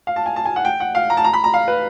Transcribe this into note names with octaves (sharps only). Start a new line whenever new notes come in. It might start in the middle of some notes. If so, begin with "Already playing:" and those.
F5
A5
G#5
A5
G#5
F#5
G5
F#5
F5
A#5
A5
A#5
B5
A#5
F5
B4